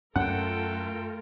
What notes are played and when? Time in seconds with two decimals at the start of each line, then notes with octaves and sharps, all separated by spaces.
0.16 F#2 A3 C#4 F4 A4 A#4 F#5 G5